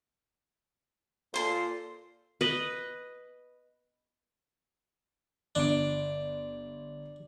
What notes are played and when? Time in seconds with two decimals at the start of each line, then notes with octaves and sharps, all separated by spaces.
1.34 A#2 F4 A4 C5 C6
2.41 B4 D#5
5.55 G1 D4 D7